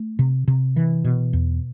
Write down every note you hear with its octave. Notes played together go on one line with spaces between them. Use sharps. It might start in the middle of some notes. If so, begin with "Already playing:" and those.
Already playing: A3
C3
C3
E3
B2
E2